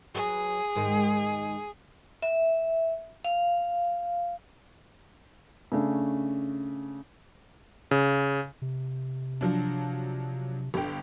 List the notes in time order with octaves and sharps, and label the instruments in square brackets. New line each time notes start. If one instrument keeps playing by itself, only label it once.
[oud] F#3 B4 [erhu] G#4
[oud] G#2 D#3 G#3
[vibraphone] E5
F5
[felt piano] C#3 A3 C#4 D4
[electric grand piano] C#3
[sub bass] C3
[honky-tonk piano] F3 F#3 D4
G1 D3 G5